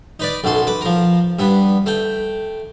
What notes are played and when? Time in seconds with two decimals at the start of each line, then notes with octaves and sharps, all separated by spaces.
0.20 D#4 B4 D5
0.44 B1 F#2 A4 C6
0.67 B4 D6
0.81 F3 A#4
1.39 G2 B3
1.86 A3 G5